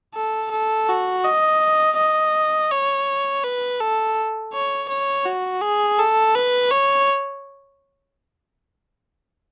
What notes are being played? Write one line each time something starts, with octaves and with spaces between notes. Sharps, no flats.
A4
A4
F#4
D#5
D#5
C#5
B4
A4
C#5
C#5
F#4
G#4
A4
B4
C#5